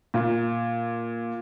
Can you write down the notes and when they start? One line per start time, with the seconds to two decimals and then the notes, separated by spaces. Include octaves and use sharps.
0.14 A#2